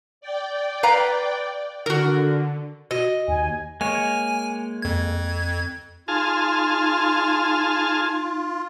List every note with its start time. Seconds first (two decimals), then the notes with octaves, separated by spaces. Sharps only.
0.21 D5 G5
0.83 B4 F5 A#5
1.86 D3 F#4 A#4
2.91 F#4 D#5
3.28 D#2 G#5
3.81 G#3 A#3 C#5 G#5
4.82 F2 G#6
6.08 D#4 F4 G#4 A5 F6